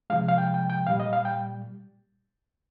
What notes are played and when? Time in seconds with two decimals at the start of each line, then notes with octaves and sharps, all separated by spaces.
0.10 C3 F3 G#3 F5
0.28 F5
0.38 G5
0.54 G5
0.70 G5
0.87 A#2 G3 F5
1.00 D#5
1.13 F5
1.25 G5